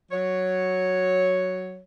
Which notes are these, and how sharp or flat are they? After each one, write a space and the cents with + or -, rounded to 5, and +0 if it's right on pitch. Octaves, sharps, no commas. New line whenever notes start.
F#3 +0 C#5 +0